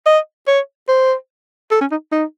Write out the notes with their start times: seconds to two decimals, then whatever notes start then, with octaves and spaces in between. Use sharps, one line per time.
0.06 D#5
0.47 C#5
0.89 C5
1.71 A4
1.81 C#4
1.91 D#4
2.12 D#4